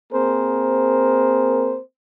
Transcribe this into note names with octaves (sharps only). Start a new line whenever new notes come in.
A#3 C4 G#4 A#4 C5